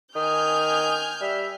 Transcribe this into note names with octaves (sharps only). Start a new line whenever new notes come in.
D#3 G#5 D#6 F6 G6
G3 E5